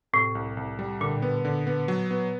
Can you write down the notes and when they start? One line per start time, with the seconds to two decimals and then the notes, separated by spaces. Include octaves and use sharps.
0.13 A2 C3
0.35 C2
0.57 C2
0.79 G3
1.01 A#2 D3
1.22 B3
1.45 D3
1.67 B3
1.88 F#3
2.11 B3